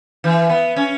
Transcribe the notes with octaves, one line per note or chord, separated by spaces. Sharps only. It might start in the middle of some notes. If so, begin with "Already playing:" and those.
E3
B3
C#4